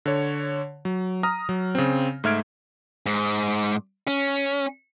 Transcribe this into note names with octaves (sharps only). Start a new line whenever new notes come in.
D3 C#5
F#3
A#5 D#6 F6 A#6
F#3
C#3 C4
G#2 A3 E5 F6 G#6 D7
G#2
C#4